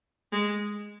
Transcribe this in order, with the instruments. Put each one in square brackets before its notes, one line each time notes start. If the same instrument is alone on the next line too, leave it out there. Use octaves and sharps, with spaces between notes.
[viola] G#3